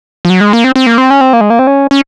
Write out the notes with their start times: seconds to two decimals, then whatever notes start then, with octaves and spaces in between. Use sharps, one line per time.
0.25 F3
0.30 F#3
0.41 G#3
0.53 A#3
0.64 C4
0.76 C4
0.86 A#3
0.98 C4
1.10 C#4
1.21 C4
1.33 A#3
1.41 G#3
1.50 A#3
1.59 C4
1.67 C#4
1.91 C#4